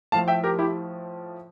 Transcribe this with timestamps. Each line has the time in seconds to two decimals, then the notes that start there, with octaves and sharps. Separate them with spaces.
0.12 A2 F3 A3 F5 A5
0.28 E5 G5
0.44 G4 A#4
0.59 E4 G4